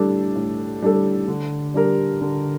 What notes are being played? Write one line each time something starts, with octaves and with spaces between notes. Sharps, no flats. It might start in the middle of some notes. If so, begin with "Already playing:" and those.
Already playing: A2 G3 D4 A4
A2
G3 D4 A4
D3
G3 D4 G4 A#4
D3